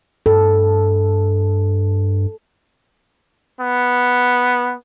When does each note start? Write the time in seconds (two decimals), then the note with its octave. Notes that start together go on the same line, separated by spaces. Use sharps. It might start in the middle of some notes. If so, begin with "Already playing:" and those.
0.26 G2 A4
3.61 B3